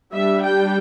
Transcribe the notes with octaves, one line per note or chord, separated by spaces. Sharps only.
G3 D4 E5
G5